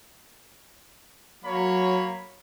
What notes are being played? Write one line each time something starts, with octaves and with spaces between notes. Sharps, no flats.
F#3 A#3 C#5 B5